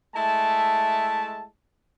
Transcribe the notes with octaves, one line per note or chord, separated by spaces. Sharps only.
G#3 A3 E4 A5